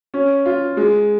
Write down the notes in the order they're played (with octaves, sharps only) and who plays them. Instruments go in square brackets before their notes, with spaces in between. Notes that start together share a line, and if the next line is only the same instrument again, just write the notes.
[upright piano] C#4
F4
G#3